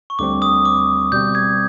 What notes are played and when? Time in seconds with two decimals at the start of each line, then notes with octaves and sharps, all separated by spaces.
0.10 C#6
0.19 D2 D3 G3 C4 D6
0.42 D#6
0.65 D6
1.12 B2 G3 C4 G6
1.35 G#6